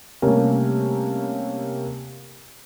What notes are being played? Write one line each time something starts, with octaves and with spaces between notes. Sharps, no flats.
C3 G3 A3 A#3 C#4 A#4